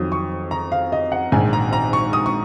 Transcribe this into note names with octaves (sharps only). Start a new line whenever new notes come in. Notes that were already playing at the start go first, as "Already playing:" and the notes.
Already playing: F2 D#3 F#3 D#6
C#6
A#5
F5
D#5
F#5
A#1 G#2 D#3 G#5
A#5
A#5
C#6
D#6
C#6